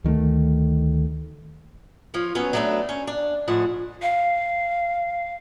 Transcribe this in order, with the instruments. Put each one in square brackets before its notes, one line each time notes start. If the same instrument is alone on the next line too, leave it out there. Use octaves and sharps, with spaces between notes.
[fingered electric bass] D2 D#3 G#3 A3
[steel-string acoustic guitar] F3 F4 C#5
F#3 B3 C#4
F#3 G3 A3 B3 D4
C#4
D4
A2 F3 G#3 F#5
[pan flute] F5